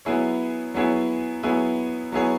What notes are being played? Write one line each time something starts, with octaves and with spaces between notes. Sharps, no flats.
F#3 B3 E4 G#4 C#5
F#3 B3 E4 G#4 C#5
F#3 B3 E4 G#4 C#5
F#3 B3 E4 G#4 C#5